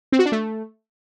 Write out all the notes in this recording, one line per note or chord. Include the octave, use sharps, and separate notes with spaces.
C4
F#4
D4
A3